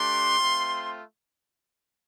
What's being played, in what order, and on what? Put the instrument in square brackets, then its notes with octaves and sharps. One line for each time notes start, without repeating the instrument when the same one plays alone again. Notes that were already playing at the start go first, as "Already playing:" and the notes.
Already playing: [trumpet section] A3 D4 G4 C6
A3 C4 F4